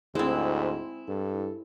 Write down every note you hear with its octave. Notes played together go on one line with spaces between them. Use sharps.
D2 G#2 G#3 C4 E4
G2 A4